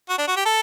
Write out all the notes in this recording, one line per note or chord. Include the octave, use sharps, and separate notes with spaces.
F#4
D4
F#4
G4
A4